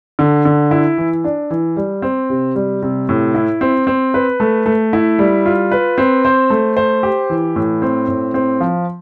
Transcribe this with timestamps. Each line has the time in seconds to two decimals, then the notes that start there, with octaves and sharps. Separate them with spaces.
0.19 D3
0.45 D3
0.71 E4
0.98 E3
1.24 D4
1.51 E3
1.76 G3
2.02 C4
2.30 C3
2.55 G3
2.82 C3
3.09 A2
3.35 E4
3.61 C4
3.87 C4
4.14 B4
4.40 A3
4.66 A3
4.93 E4
5.19 G3
5.46 F4
5.72 B4
5.98 C4
6.25 C5
6.50 A3
6.77 C5
7.03 G4
7.30 E3
7.56 A2
7.82 C4
8.08 A2
8.34 C4
8.60 F3